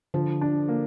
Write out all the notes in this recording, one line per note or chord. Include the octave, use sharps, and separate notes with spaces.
D3 F3
D4
A#3